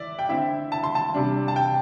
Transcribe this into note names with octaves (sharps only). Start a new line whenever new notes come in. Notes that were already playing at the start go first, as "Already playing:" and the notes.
Already playing: E3 D5 E5
G5
D3 C4 E4 E5
A5
C6
A5
C3 G3 D4
A5
G5